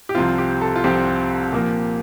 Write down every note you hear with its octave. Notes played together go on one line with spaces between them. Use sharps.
G4
C2 C3 F3 C4 F4
G4
A4
F4
C2 C3 F3 C4 G4
A#2 F3 A#3